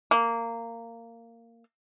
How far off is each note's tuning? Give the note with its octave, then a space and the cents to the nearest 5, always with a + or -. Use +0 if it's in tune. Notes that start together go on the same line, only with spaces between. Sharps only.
A#3 -15